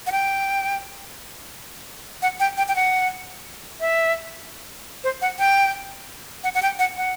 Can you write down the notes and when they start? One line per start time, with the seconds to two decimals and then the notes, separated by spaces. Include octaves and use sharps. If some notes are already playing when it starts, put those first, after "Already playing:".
0.07 F#5
0.12 G5
2.22 F#5
2.40 G5
2.57 G5
2.68 G5
2.76 F#5
3.80 E5
5.04 C5
5.22 F#5
5.39 G5
6.44 F#5
6.55 F#5
6.62 G5
6.79 F#5
6.97 F#5